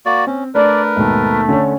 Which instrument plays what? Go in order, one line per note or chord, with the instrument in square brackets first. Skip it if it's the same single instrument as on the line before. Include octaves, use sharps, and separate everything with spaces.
[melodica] A#3 F#4 D5
[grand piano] C4 [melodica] C#4
[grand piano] A3 D4 [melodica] A#4 B4 [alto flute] D5
[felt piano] D#2 B2 [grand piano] G#2 [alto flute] A3
[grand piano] D3 [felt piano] C#4 C#5